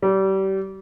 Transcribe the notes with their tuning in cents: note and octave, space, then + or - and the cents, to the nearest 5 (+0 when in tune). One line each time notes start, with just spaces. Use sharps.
G3 -30